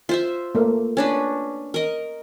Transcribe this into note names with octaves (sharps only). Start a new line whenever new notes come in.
F4 C5 E5
A3 A#3
C#4 D4 B4
A#4 D#5